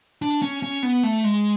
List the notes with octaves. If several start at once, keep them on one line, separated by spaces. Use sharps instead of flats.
D4
C#4
C#4
B3
A3
G#3